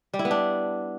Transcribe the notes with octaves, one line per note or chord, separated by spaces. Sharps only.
G3
E4
B3
D4